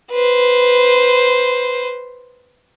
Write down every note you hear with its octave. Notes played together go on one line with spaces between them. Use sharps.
B4 C5